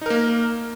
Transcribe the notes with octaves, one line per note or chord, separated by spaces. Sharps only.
A#3 D#4 A#4